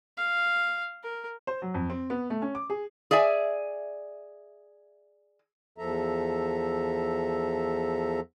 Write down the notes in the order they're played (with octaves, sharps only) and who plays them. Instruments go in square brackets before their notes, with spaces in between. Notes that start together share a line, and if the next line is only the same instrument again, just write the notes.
[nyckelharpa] F5
A#4
[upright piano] C5
F#3
F2
C4
B3
A3
C#4
D6
G#4
[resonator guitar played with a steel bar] G#4 D5 E5 G#5
[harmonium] E2 F3 A4 E5 A#5